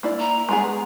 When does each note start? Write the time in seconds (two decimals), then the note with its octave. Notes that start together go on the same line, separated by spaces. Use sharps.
0.03 A#3 E4 D5
0.20 A#5
0.49 G#3 B3 G#4